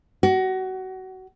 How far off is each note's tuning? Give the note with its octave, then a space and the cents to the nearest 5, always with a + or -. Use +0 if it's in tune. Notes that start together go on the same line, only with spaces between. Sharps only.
F#4 +25